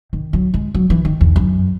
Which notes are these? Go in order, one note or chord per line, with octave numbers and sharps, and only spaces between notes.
D#3
F#3
G#3
F#3
E3
D#3
E2
F#2